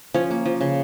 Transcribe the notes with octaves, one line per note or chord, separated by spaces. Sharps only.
F3 C#4 C#5
A#3
F3
C#3